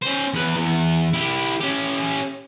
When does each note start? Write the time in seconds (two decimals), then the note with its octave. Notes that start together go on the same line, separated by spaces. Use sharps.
0.02 C#4 C5
0.33 E2 B4
0.55 E2
1.14 E4 G4
1.61 C#4 G4